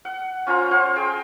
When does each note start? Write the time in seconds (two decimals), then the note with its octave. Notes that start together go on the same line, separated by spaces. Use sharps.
0.05 F#5
0.47 C#4 F4 C5 A#5
0.71 C5 F5 F#5
0.96 G#4 G5